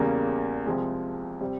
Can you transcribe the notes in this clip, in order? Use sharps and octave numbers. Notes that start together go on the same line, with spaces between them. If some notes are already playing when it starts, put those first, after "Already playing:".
Already playing: E2 C#3 G3 A#3
C2 C3 F3 G#3
C3 G3 C4